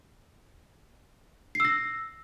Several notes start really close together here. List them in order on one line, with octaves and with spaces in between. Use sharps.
C7 E6 A#6